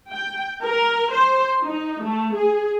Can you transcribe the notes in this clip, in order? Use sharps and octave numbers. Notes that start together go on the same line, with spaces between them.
G5
A#4
C5
D#4
A3
G#4